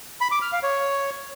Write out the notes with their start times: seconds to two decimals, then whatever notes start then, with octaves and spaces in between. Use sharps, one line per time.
0.21 B5
0.31 D6
0.42 F6
0.52 F5
0.63 C#5